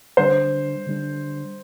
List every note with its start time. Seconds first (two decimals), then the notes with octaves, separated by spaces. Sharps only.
0.17 D3 G3 D4 C5
0.87 D3 G3 D4